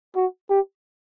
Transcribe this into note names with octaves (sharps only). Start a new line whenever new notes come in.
F#4
G4